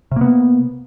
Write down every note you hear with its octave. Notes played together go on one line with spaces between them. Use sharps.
C3 A#3 B3